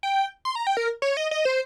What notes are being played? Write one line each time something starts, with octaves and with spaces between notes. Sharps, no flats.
G5
C6
A#5
G5
A#4
C#5
D#5
D#5
C5